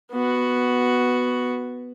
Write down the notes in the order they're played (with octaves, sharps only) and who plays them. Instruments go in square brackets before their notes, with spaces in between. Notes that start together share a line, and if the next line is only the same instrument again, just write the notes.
[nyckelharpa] B3 F#4